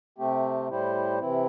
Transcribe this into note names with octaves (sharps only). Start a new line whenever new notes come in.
C3 A3 C4 G4
A2 G3 E4 G4 C5
C3 E3 C4 E4